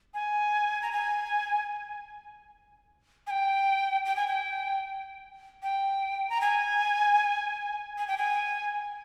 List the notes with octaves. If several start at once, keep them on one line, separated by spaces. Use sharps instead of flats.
G#5
A#5
G#5
G#5
G5
G5
G#5
G5
G5
A#5
G#5
G#5
G5
G#5